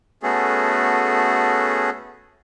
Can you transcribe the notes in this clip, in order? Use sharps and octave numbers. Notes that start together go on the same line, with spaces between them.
A3 B3 C#4 F#4 G#4 A4